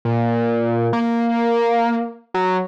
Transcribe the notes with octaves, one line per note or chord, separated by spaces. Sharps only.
A#2
A#3
F#3